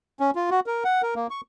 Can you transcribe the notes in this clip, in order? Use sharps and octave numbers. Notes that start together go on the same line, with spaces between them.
C#4
F4
F#4
A#4
F#5
A#4
A#3
C#6